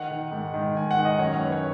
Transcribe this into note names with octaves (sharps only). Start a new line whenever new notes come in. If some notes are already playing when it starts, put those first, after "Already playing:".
Already playing: D#3 F#5
D#3
G#2
D#3
G#2 G#5
F#5
D#3
D#5
F#2 C#5
F#2 B4
C#5